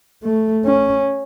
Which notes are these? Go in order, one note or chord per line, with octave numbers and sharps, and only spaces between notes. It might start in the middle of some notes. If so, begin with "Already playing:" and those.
A3
C#4